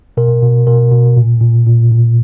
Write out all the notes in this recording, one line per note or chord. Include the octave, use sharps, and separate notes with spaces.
B2 A#4
B2
B2 A#4
B2
A#2
A#2
A#2
A#2